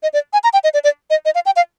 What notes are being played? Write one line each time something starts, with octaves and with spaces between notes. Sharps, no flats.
D#5
D5
G#5
A#5
G5
D#5
D5
D5
D#5
D#5
F5
G5
F5